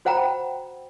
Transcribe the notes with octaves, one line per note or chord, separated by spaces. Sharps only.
F#4 C5 F#5 G5 A#5 B5